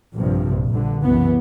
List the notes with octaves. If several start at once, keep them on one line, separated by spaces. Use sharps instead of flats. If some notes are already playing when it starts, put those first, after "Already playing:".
A#1 G2 C3 F3
A#1 G2 D3
C2 F#2 C#3 E3 B3